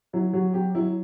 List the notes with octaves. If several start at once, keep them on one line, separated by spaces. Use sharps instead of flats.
F#3 E4
F#3 F#4
F#3 G4
F#3 E4